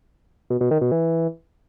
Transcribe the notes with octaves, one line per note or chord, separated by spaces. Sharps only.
B2
B2
D#3
B2
E3